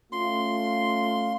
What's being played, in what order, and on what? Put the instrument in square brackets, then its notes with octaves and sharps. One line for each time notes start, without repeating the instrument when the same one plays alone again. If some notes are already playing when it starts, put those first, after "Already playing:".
[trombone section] A3 C#4 F4 [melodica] C6